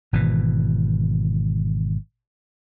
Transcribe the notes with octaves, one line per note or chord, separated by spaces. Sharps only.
G#1 B2 E3